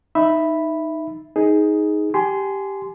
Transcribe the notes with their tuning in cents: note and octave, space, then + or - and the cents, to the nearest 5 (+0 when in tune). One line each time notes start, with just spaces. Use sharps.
D#4 +0 E5 +0 B5 +0
D#4 +15 G#4 +0
G4 +0 G#5 +20 C6 -15